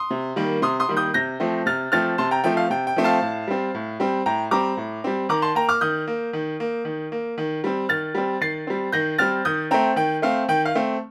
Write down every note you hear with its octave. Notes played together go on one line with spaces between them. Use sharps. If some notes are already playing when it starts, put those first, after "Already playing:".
Already playing: C6 D#6
C3
D#3 G3 A#3
C3 C6 D#6
C6 D#6
D#3 G3 A#3
D#6 G6
C3 G6 A#6
F3 A3 C4
C3 F6 A6
F3 A3 C4 F6 A6
C3 A5 C6
G5 A#5
F3 A3 C4 G5
F5
C3 G5
G5
F3 A3 C4
F5 A5
A2
G3 C4
A2
G3 C4
A2 G5 A#5
G3 C4 A#5 D6
A2
G3 C4
D#3 A#5 D6
A5 C6
A#3 G5 A#5
D6 F6
D#3 D#6 G6
A#3
D#3
A#3
D#3
A#3
D#3
G3 C4
D#3 F6 A6
G3 C4
D#3 A6 C7
G3 C4
D#3 G6 A#6
G3 C4 F6 A6
D#3 D#6 G6
A3 C4 G5 A#5
D#3 G5
A3 C4 F5
D#3 G5
F5
A3 C4